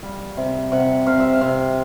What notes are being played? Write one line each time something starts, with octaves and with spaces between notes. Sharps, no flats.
G3 F5
C3
C3 F#5
C3 F5
E5
F5
C3